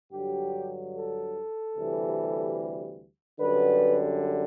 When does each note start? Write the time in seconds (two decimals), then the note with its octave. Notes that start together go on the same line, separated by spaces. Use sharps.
0.11 G2 D3 F#3 G4
0.94 A4
1.76 D2 C3 E3 G3
3.40 F#2 D3 G3 B4